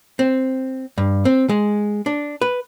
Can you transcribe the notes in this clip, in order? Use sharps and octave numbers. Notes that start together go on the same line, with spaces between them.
C4
G2
C4
G#3
D4
B4